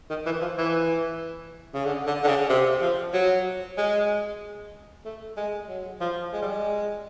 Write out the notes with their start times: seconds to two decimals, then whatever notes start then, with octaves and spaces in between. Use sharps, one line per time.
0.09 D#3
0.26 E3
0.41 F3
0.58 E3
1.74 C#3
1.85 D3
2.07 D3
2.23 D3
2.28 C#3
2.49 C3
2.81 F3
3.13 F#3
3.77 G#3
5.05 A3
5.37 G#3
5.69 F#3
6.00 F3
6.32 G#3
6.42 G3
6.51 G#3